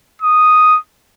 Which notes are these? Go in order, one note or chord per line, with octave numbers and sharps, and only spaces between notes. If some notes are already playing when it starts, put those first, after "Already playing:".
D#6